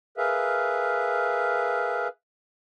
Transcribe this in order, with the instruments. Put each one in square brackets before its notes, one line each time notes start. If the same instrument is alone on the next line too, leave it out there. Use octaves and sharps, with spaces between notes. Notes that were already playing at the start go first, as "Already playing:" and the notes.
[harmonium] G#4 A#4 B4 E5 F5